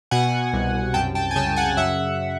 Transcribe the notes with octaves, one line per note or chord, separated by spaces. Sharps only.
B2 F#5 G#5
C2
F#2 G5 A5
G5 A5
G#5
C#3 G5 A5
F#5 G#5
F#2 E5 F#5